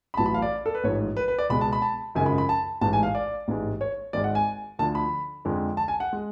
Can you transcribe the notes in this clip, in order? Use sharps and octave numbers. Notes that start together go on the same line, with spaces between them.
B5
A1 A2 F#3 A5
B5
F5
D5
A4
B4
A1 G#2 F3 C#5
B4
B4
D5
C#2 B2 G#3 B5
A5
B5
A5
G#1 F#2 C#3 F3 G#3 G#5
B5
B5
A5
A1 G#2 G#3 A5
G#5
F5
D5
A1 G#2 G#3
C#5
G#1 G#2 G#3 D5
F#5
G#5
D2 D3 F3 A5
B5
F2 D3 G#3
A5
G#5
F#5
G#3